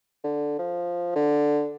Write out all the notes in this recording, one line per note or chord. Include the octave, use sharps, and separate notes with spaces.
D3
F3
D3